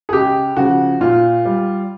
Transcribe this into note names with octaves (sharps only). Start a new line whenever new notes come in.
G#4
C#2 G4
C#3 F3 F#4
A#2 F4
G3